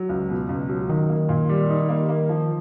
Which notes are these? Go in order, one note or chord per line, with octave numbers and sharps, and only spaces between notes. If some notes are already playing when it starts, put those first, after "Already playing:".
Already playing: F#3
C#2
B2
C#2
F#3
D#3 D#4
A#3
A#2
G3
D#4
A#3
A#3
F3